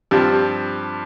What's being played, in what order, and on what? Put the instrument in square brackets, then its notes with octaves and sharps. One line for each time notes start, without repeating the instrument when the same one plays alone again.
[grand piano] G2 F3 C4 F4 [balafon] G4